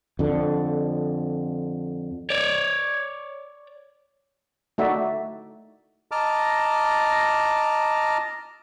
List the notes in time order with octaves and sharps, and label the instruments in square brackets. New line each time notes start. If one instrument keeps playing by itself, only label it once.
[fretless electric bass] F2 D3
[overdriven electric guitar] C#5 D5
[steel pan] A3 D#4 F#4 D5 E5
[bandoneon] D#5 A5 A#5 D6 F6